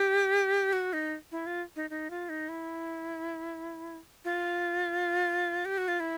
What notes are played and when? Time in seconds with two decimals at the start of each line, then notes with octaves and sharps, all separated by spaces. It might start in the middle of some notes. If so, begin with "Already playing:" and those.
Already playing: G4
0.73 F#4
0.93 D#4
1.32 E4
1.46 F4
1.76 D#4
1.90 D#4
2.10 F4
2.29 D#4
2.49 E4
4.25 F4
5.65 G4
5.78 F#4
5.88 F4
6.00 E4